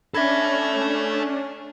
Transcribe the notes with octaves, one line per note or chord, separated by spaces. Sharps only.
C#4 D4 A4 E5 B5 G#6 A#6